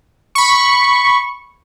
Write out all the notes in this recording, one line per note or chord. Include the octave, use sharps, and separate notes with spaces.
B5 C#6